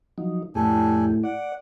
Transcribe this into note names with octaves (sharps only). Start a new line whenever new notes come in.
F3 F#3 D#4
F2 A2 D4 G4 A4 G#5
D5 F#5